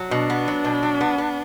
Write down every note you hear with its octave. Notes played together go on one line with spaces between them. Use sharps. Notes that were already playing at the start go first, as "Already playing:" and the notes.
Already playing: F#3
B2 D4
B3
F#3
B2
F#3
B3
B3